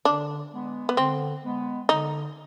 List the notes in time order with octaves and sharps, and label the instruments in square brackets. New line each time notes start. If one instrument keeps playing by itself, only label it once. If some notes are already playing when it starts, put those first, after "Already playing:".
[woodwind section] D3 [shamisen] D4
[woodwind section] G#3 B3
[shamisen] B3
[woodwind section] D3 [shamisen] C4
[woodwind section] G#3 B3
[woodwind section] D3 [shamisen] D#4